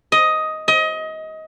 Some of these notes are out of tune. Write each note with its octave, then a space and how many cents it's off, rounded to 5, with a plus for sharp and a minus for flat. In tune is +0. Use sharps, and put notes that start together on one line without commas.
D#5 +10
D#5 +25